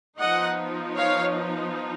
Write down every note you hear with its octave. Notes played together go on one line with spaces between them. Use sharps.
F3 B3 D#4 D#5 F#5
C#5 F5